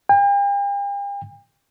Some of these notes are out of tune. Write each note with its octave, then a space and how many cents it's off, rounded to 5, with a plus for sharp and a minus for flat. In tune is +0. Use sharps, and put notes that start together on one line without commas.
G5 +45